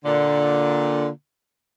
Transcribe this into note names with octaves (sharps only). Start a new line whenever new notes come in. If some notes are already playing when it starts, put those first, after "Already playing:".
A#2 D3